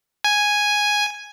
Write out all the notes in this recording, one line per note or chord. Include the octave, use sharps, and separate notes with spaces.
G#5